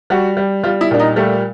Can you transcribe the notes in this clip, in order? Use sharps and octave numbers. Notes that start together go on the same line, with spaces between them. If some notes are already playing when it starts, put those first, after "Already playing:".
G3 F#4
G3
G3 F4
E4
A#2 D4
D#4
G3 A3